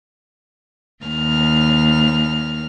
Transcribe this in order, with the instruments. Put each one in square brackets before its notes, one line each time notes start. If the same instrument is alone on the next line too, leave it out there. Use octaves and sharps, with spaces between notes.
[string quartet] D#2 F6